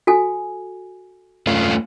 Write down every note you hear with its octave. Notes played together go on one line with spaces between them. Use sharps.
F#4 A4 G#5
A3 C#4 F4